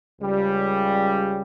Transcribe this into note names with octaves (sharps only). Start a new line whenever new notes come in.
C#2 C#3 G3